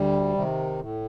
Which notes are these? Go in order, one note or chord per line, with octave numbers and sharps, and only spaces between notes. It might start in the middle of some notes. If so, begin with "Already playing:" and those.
Already playing: D2 G3
C3 D#3
A2